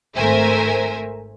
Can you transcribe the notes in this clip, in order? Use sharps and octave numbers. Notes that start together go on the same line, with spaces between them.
G#1 A3 A#4 C5 E5 G#5